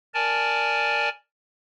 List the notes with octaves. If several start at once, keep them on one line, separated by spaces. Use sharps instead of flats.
A#4 D5 G#5 A5